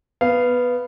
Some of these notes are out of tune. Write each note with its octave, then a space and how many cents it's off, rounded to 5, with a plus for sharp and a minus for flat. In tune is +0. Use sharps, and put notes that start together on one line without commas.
B3 +0 F5 -15